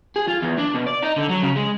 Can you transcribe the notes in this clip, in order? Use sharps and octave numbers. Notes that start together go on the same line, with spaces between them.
G#4
F4
E2
D4
B2
D5
D#4
D3
F#3
C#3
G#3